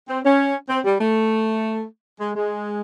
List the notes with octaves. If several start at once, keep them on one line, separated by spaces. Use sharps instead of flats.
C4
C#4
C4
G3
A3
G#3
G#3